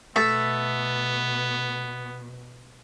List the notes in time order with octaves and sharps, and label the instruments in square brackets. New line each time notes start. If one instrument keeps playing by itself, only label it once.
[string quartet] B2 [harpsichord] A3 A4 [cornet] B3 [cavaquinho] E5